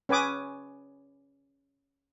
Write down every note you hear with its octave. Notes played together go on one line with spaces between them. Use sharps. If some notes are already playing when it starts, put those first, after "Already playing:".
C#4 B4 G#5 D6 D#6